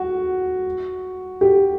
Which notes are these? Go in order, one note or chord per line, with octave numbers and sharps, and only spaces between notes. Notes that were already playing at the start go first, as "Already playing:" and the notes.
Already playing: F#4
G4